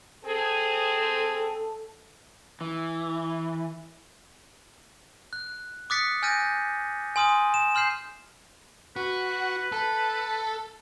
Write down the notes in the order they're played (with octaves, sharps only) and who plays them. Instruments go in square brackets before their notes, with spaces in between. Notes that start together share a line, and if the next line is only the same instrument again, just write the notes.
[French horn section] C4 G#4 [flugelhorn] A4
[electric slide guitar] E3
[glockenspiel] F#6
D6 D#6 F#6 A6 B6 C#7
G#5 F6 G6 A6 A#6 D#7
G#5 C6 D#6 F6 D#7
E7
C6 F6 G6 C7 E7
[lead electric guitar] F#4 [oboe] B4
[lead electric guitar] A4